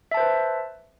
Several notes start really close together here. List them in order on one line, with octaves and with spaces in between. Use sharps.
E5 A5 C5 B4